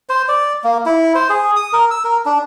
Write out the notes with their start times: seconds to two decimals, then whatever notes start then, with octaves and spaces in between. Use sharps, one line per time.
0.09 C5
0.28 D5
0.64 A#3
0.86 E4
1.15 C5
1.29 G#4
1.56 D#6
1.73 A#4
1.91 E6
2.04 A#4
2.26 D4